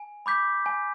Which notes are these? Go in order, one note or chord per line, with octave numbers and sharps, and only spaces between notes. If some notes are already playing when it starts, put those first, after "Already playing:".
Already playing: G#5
B5 D6 G6 B6
G#5